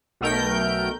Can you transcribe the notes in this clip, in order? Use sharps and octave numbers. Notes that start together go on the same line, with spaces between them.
B1 B2 A3 A#4 G5 G6